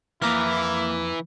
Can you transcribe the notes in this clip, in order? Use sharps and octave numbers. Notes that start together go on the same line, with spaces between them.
F2 E3 A#3 E4 A#5 D6 F6